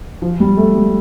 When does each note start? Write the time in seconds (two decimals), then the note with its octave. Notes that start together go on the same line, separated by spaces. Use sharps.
0.22 F3
0.40 G3
0.57 A3
0.75 G3